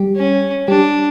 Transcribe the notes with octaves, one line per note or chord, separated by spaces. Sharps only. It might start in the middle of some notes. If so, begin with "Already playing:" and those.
Already playing: G3 G4
C#4
G3 D4 G4